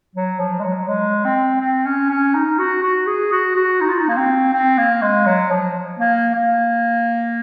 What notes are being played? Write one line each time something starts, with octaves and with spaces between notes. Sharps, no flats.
F#3
F3
G#3
F#3
G#3
C4
C4
C#4
C#4
D#4
F#4
F#4
G#4
F#4
F#4
D#4
F4
D#4
A#3
C4
C4
A#3
G#3
F#3
F3
A#3
A#3